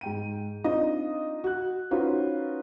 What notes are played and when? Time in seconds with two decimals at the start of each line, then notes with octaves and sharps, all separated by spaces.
0.01 G#2 G5 D#7
0.64 C4 D4 D#4 F4 D#5
1.44 F#4 F#6
1.91 C#4 D#4 F4 F#4 B4 C5